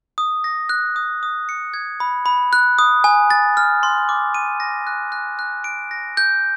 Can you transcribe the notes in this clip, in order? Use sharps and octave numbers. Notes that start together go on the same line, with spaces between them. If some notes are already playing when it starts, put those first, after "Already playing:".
D#6
A#6
F#6
D#6
D#6
C#7
G#6
B5
B5
F#6
D#6
G#5
A6
F6
C6
D6
D#7
A#6
F#6
F#6
F#6
D7
A#6
G6